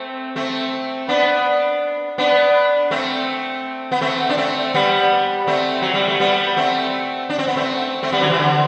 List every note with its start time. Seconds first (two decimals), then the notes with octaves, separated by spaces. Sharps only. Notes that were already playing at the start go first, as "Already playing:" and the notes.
Already playing: A3 C4
0.36 A3 C4
1.09 B3 D4
2.18 B3 D4
2.91 A3 C4
3.92 B3
4.01 A3 C4
4.29 D4
4.37 A3 C4
4.74 G3 B3
5.47 A3 C4
5.82 F#3
5.94 G3
6.08 A3
6.20 G3 B3
6.57 A3 C4
7.30 D4
7.38 C4
7.47 B3
7.56 A3 C4
8.03 A3 C4
8.12 G3 B3
8.21 D3 F#3
8.30 C3 E3
8.39 D3